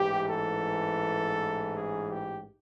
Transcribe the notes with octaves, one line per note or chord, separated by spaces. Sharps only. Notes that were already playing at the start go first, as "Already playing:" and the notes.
Already playing: A1 G#2 E3 G4
A4
G#4
G4